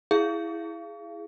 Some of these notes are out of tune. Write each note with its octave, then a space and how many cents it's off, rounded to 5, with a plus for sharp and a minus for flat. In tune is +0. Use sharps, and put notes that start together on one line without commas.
E4 +0 G#4 +0 F5 -30